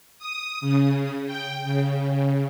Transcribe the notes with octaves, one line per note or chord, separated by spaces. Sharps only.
D#6
C#3
G5
C#3